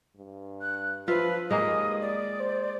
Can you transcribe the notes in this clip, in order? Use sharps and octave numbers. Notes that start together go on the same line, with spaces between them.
G2
F#6
F3 F4 B4 E5
D#2 G#3 A#3 D#6
D5
C5